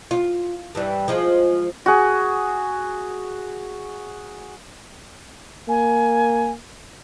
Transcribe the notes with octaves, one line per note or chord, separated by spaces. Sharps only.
F4
G2 E3 G3
F3 G#3 F4
F#4 G#4
A#3 G#5